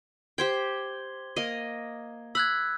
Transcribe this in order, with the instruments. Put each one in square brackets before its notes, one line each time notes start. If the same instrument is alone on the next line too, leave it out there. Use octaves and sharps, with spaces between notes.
[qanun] G4 C5 G5 [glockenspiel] G#6 G7
[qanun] A#3 D#5
[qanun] B5 [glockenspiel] E6 F#6 G#6